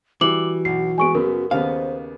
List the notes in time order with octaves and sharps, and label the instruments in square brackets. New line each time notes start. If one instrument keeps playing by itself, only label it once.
[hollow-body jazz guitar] E3 [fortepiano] G3 [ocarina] F#4 [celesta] D6 F#7
[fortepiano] B1 [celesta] C7
[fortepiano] G#3 B3 [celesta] G#5 C#6 D7
[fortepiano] F#2 C#3 B3 [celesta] A#4
[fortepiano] D#2 C#3 B3 [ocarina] C5 [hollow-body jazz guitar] F5